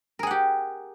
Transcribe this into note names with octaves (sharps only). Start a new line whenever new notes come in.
G4 G#4 A#4 F#5